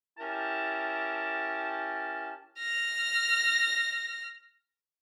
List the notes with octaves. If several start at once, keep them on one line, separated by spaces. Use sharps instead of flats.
C#4 E4 G4 A#4 A5
F6 A#6